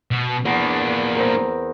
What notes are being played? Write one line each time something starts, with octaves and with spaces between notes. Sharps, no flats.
B2
E2 A#3 D4
C4 A#4